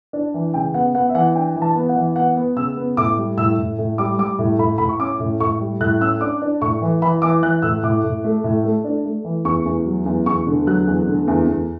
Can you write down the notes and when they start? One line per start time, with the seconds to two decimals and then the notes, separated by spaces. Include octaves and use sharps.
0.13 D4
0.34 E3
0.54 C#3 G5
0.74 B3 F#5
0.95 B3 F#5
1.09 E5
1.14 E3 F#5
1.35 D4 G5
1.56 E3
1.62 A5
1.76 B3
1.89 F#5
1.96 E3
2.16 B3 F#5
2.36 B3
2.57 C#3 E6
2.77 B3
2.97 A2 D6
3.18 G3
3.38 A2 E6
3.57 A2
3.78 A2
3.98 G3 D6
4.18 G3 D6
4.39 A2
4.59 A2 B5
4.78 A2 B5
4.89 C#6
5.00 C#4 D6
5.20 A2
5.40 A2 C#6
5.61 G3
5.80 A2 F#6
6.00 C#4 E6
6.21 D4 D6
6.42 D4
6.62 A2 C#6
6.82 E3
7.02 E3 B5
7.22 E3 D6
7.42 E3 F#6
7.62 A2 E6
7.83 A2 D6
8.04 A2
8.24 A3
8.44 A2
8.64 A3
8.84 D4
9.05 A3
9.25 E3
9.45 E2 C#6
9.65 E2
9.86 F#3
10.06 E2
10.26 E2 C#6
10.47 D3
10.66 F#3 F#6
10.87 E2
11.07 D3
11.28 E2
11.47 E2